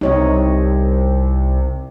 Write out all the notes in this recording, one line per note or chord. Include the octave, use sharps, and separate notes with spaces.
C2 C3 D#4 C#5 D#5